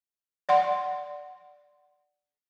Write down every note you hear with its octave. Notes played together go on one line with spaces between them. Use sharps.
D5 F#5 C6